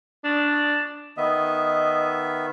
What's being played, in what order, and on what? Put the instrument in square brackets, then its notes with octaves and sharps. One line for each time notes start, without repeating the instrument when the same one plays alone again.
[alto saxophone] D4
[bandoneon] D#3 B3 E5 [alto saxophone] D#5